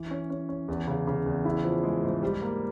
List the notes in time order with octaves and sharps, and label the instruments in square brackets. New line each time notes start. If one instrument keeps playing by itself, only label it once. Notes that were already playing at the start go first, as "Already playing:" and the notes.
Already playing: [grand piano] E3
C#4
C#4
C#4
E2
C#3
C#3
E2
E4
F3
G#3
G#2
G3
A#3